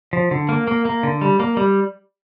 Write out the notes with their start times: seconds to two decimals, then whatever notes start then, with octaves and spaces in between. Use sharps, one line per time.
0.13 F3
0.31 D3
0.49 A#3
0.68 A#3
0.85 A#3
1.03 D3
1.21 G3
1.40 A#3
1.57 G3